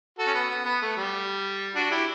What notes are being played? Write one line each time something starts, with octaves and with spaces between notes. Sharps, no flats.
F#4 A4
C#4
B3
B3
B3
A3
G3
D4 F#4
E4 G4